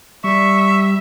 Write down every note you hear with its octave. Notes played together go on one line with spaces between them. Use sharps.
G3 E5 C#6